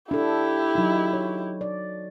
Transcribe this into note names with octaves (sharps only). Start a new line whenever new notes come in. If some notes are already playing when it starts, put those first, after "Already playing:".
D4 E4 G4 A4
F#3 D#4
C#5
D5